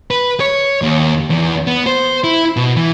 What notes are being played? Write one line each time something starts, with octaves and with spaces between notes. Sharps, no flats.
B4
C#5
D#2
E2
B3
C5
E4
B2
E3